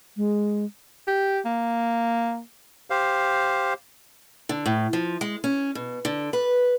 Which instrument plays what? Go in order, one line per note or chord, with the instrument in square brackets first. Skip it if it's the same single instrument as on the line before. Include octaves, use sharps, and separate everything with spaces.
[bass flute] G#3
[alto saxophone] G4
A#3
[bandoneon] G4 C5 F5
[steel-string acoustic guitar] D3
A2
F3
G#3
C#4
B2
D3
B4